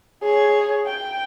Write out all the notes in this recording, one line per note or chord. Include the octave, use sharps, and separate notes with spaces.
G#4 C#5
G5